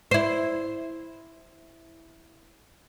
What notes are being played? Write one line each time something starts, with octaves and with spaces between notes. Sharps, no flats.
E4 C5